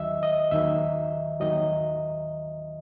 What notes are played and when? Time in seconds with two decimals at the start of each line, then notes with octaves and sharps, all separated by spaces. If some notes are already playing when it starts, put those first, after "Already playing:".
Already playing: D#2 D#3 F#3 D#5 E5
0.23 D#5
0.51 D#2 D#3 F#3 E5
1.40 D#2 D#3 F#3 D#5